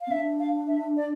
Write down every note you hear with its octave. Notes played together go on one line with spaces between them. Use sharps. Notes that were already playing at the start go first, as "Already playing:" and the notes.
F5
C4
D4 E5
F5
E5
D5